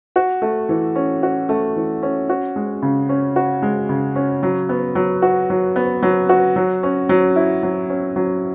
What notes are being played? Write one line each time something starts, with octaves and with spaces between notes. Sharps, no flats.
F#4
A3
E3
C#4
F#4
A3
E3
C#4
F#4
G#3
C#3
C#4
F#4
G#3
C#3
C#4
F#3
B3
F#3
F#4
F#3
B3
F#3
F#4
F#3
C#4
F#3
E4
F#3
C#4
F#3